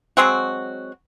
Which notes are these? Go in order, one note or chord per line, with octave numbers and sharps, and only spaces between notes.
F#3 G#3 C4 F#4